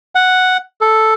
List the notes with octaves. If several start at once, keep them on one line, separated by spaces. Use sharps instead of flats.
F#5
A4